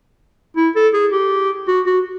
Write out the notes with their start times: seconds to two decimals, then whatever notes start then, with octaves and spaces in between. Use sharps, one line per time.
0.57 E4
0.75 A4
0.94 G#4
1.12 G4
1.68 F#4
1.86 F#4